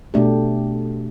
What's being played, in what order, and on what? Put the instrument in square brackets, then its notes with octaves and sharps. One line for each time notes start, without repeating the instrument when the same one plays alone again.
[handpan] B2 A3 D4 G4